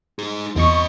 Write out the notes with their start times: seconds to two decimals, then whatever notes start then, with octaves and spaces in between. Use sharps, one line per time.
0.19 D#4 G#4
0.56 E2 C4 D#5 C#6